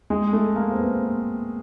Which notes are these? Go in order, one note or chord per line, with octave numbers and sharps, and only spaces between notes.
G#3
A3
A#3
C4
B3